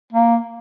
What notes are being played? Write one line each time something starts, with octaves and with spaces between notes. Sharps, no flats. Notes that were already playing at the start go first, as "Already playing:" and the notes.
A#3